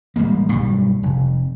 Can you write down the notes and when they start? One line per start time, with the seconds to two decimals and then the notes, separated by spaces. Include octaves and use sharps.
0.16 A1 G3 G#3 A#3
0.52 B1 G2 F#3 G3
1.03 F1